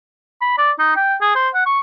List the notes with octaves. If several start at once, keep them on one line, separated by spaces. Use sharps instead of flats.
B5
D5
D#4
G5
G#4
C5
F#5
C#6